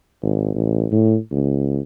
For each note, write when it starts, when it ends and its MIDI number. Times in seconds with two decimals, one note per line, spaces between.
0.22 0.51 32
0.54 0.87 33
0.92 1.17 45
1.31 1.79 37